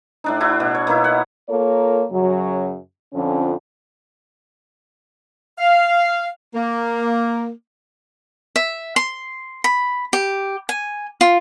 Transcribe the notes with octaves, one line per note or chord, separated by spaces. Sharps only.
A2 D4 D#4
D4 E4 F#4
B2
C#5
B2 A#3 D#4 E4
F#5
A#3 F4 A4 A#4 C#5
F#2 C#3 F#3
F2 D3 F3 C#4
F5
A#3
E5
C6
B5
G4
G#5
F4